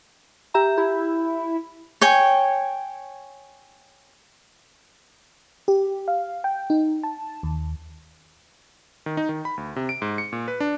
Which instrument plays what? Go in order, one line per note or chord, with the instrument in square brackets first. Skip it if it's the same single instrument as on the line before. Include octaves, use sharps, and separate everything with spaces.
[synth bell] G4 E5 A#5
[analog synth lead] E4 [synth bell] G4
[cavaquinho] C#5 G5 G#5
[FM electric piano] G4
F5
G5
D#4
A5
D#2
[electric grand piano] D#3
D#4
D#3
B5
D2
C3
D7
G#2
C#7
A#2
B4
D4